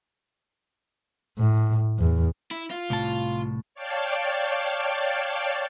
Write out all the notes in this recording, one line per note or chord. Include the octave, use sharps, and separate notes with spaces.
A2
E2
E4
F4
C2 A2 A5
C#5 D5 F5 G5 A5